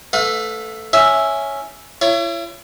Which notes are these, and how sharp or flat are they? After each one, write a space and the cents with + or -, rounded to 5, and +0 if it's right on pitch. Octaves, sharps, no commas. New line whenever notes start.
A3 +0 B4 +15 F5 +45
C#4 +0 E4 +0 E5 +0
E4 +40 C#5 +5